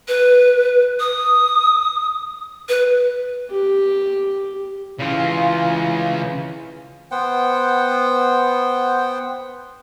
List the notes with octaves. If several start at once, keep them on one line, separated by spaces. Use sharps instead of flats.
B4
D#6
B4
G4
C#3 E3 F4
B3 C5 F#5 G5